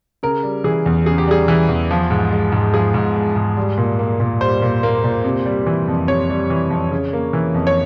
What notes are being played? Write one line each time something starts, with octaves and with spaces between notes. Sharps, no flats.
C#3 A#4
G3
E3 G#4
E2
C#3 G#4
G4
G3 G#4
E3
E2
F3
G#2
G#3
G#2
F3 G#4
G#2
G#3
G#2
G3
A#2
A#3
A#2
G3 C5
A#2
A#3
A#2
C3
G3
E3
F2
C3 C#5
G3
E3
F2
C#3
A#3
E3
F2
C#5